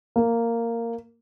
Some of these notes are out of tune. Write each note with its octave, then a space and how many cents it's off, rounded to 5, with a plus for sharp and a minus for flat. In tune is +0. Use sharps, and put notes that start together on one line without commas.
A#3 -10